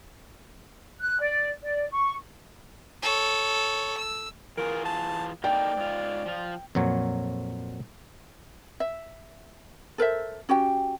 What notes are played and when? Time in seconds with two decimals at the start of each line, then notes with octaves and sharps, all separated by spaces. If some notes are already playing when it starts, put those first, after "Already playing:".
1.00 F#6
1.19 D5
1.62 D5
1.91 C#6
3.02 A4 C#5
3.97 E6
4.57 E3 F4 G#4 A#4
4.85 A5
5.44 A#3 D#4 A4 D5 G5
5.76 G#2 F4
6.26 F3 F4
6.75 F2 A#2 F#3 C#5
8.80 E5
9.98 A4 A#4 C5 E5
10.49 C#4 F#4 G4 G5